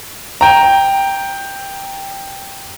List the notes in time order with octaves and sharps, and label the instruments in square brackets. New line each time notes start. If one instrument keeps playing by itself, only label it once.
[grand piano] G5 A#5